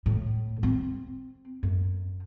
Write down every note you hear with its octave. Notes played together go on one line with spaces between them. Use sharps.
A2
C4
F#2